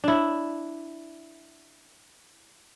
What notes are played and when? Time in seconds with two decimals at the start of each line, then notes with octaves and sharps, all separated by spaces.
0.04 D4 E4